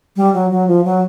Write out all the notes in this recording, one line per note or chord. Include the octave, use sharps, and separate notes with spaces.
G3
F#3
F#3
F3
F#3